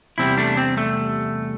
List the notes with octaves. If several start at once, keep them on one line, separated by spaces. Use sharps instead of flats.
E2 C3 G3 C4 E4
A3 D4
C4
A3